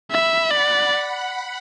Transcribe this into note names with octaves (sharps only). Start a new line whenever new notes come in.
E5 B5
D5 F#5